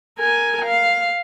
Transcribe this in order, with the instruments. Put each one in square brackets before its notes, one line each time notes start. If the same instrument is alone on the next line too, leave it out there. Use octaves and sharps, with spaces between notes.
[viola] A#4 G#5
F5